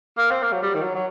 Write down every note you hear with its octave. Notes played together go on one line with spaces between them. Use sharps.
A#3
C4
A#3
F#3
G3
D#3
F#3
F#3